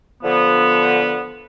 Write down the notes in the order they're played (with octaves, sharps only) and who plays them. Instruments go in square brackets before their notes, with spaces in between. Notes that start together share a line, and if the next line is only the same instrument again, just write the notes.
[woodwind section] D3 F3 B3